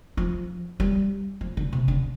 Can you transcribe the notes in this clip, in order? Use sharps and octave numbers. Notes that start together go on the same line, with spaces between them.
F3
G3
F3
D3
C3
D3